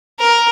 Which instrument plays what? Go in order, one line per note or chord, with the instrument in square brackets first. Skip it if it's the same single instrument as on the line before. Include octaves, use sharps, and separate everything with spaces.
[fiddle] A#4